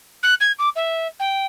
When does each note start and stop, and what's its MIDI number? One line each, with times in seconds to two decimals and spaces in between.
0.23 0.34 90
0.40 0.52 92
0.59 0.69 86
0.76 1.07 76
1.19 1.46 79